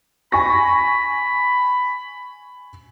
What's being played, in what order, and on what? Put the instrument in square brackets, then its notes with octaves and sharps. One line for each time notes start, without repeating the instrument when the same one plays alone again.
[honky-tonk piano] G#5 C#6 A#6 [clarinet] B5